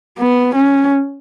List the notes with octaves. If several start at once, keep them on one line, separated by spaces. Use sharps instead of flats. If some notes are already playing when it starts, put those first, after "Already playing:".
B3
C#4